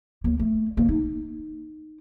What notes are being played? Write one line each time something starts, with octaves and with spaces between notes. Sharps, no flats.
D2 A#3
A3
D3 A#3
D#4